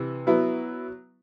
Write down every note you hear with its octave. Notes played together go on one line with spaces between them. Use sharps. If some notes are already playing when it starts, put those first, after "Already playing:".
Already playing: C3 E3
F#3 B3 E4